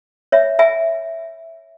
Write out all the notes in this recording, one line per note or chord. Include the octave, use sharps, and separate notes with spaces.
C#5 E5
E5 G#5